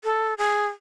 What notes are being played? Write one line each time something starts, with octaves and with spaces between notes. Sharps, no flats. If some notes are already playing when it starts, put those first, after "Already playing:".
A4
G#4